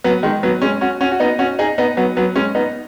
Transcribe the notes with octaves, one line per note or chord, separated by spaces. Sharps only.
F#3 B3
D#3 G#3
F#3 B3
G#3 C#4
C#4 F#4
C#4 F#4
F#4
B3 D#4
C#4 F#4
D#4 G#4
B3 D#4
F#3 B3
F#3 B3
G#3 C#4
B3 D#4